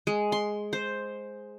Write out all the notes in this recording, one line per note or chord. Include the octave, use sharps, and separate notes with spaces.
G#3
C6
C5